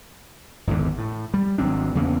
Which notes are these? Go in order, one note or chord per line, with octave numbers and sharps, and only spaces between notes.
G#1 E2 G#2 D3
A2
G3
G#1 F#3 C4 D4
E2 C#3 A#3 B3